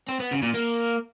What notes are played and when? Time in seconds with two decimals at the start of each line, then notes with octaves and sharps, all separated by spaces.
0.08 C4
0.20 B3
0.31 C#3
0.43 A#2
0.54 A#3